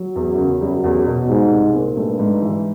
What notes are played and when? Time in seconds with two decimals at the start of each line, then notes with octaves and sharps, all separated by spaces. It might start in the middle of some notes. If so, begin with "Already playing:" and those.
Already playing: F#3
0.16 E2
0.28 F#2
0.38 C#3
0.61 F#2 G3
0.84 E2
1.07 B2
1.28 G#2 G3
1.51 C2
1.74 A#2
1.96 G2 A3
2.19 G#2
2.42 E3